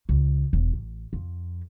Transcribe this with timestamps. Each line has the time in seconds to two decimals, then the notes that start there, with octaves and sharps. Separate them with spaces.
0.09 C#2
0.53 E1
0.73 A1
1.13 F2